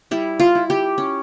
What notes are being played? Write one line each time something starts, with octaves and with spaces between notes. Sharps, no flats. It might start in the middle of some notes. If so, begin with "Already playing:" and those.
G3 E4
F4
E4
G4
C#4